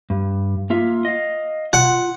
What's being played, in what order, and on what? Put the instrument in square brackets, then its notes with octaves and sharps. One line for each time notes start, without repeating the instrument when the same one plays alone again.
[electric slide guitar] G2
A#3 F4 E5
D#5 F5
[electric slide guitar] F4 [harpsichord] F#5